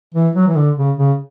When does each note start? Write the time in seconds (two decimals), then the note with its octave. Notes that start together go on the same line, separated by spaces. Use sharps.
0.14 E3
0.35 F#3
0.48 E3
0.56 D3
0.77 C#3
0.98 C#3